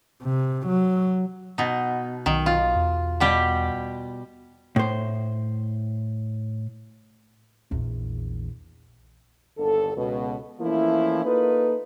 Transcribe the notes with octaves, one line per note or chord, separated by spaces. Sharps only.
C3
F#3
B2 D#4
B1 D#3
F4
E2
B2 G3 G4
A2 C5
A#1 E2
G1 D#2 D3 A4
C#2 B2
E3 F3 A3 A#3 C#4 E4
A#3 D#4 F4 A4 B4